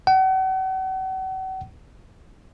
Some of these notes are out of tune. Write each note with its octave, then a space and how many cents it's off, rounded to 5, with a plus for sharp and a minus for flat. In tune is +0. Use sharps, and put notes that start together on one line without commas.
F#5 +40